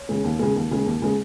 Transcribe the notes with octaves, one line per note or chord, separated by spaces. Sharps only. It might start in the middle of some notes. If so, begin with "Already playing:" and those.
Already playing: C#5
C#3 G#3
D#2
C#3 G#3
D#2
C#3 G#3
D#2
C#3 G#3